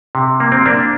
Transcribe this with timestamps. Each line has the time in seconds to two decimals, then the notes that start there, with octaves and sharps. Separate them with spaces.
0.15 C3
0.40 A#3
0.52 C4
0.66 A#3 D4